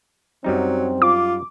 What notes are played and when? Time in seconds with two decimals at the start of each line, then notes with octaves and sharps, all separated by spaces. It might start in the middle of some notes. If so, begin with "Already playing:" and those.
0.44 F#2 F#3 G3 C4 D#4
1.02 F4 D6